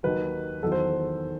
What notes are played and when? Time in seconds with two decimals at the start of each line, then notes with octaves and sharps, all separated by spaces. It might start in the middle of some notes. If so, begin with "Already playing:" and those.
0.03 D#2 D#3 F#3 B4
0.62 E2 D#3 F#3 A4
0.72 C5